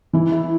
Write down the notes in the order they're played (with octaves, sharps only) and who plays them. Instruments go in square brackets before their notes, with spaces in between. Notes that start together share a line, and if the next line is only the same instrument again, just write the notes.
[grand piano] E3 [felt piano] E4
[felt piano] E4